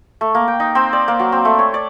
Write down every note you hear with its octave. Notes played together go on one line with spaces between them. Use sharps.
A3
A#3
G5
D#4
C4
D5
A#3
F#3
C4
A3
C#5
D5